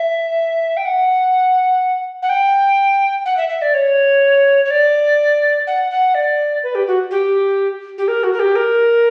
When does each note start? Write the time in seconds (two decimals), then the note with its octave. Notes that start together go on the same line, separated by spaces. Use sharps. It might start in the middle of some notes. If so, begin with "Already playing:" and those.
Already playing: E5
0.77 G5
0.85 F#5
2.23 F#5
2.29 G5
3.26 F#5
3.37 E5
3.49 E5
3.62 D5
3.74 C#5
4.65 C#5
4.70 D5
5.67 F#5
5.91 F#5
6.15 D5
6.63 B4
6.75 G4
6.87 F#4
7.11 G4
7.98 G4
8.08 A#4
8.23 F#4
8.33 A#4
8.40 G4
8.56 A#4